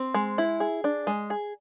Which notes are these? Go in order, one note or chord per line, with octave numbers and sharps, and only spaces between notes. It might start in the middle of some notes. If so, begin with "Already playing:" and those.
Already playing: C4
G#3
E4
G#4
D4
G#3
G#4